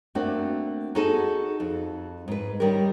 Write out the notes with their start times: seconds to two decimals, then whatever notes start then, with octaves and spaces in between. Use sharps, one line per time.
0.15 A3 A#3 C4 D4 F#4
0.95 D#4 F#4 G#4 A4 D#5 A5
1.60 F2
2.28 G#2 B4
2.60 D#3 G3 C#4 G4 A#4